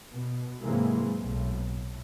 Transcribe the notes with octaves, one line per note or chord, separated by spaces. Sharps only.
B2
G#2 C3 E3 F#3 G#3 A#3
B1 A2
A2